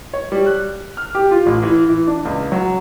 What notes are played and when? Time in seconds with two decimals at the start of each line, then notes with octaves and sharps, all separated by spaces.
0.14 C#5
0.32 G3
0.46 F#6
0.97 F6
1.15 G4
1.31 F4
1.46 A1
1.63 E3
1.89 E3
2.07 D4
2.25 C#2
2.52 F#3